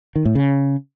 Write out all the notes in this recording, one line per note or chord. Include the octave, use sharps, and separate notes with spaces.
D#3
A2
C#3